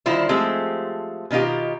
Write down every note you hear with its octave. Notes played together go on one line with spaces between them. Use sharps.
D3 D#3 G3 E4 F4 C5
F3 G#3 A3 C4 G4
B2 D#3 D#4 F4 G4